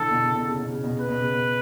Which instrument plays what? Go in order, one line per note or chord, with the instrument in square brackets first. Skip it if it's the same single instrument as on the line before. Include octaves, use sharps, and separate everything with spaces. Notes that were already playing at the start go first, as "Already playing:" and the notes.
Already playing: [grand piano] D3 E3 [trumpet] A4
[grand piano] B2
C#3
B2
C#3
B2
C#3
B2
[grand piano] C#3 [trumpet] B4
[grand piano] B2
C#3
B2